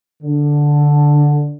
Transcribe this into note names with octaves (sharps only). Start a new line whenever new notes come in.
D3